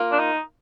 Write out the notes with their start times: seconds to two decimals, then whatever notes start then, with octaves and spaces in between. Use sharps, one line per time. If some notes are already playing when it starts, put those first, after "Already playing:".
Already playing: A#3 F4 A#4
0.12 D4
0.19 D#4